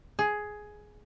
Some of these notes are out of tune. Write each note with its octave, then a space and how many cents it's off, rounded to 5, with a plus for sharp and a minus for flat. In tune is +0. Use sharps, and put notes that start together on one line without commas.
G#4 +10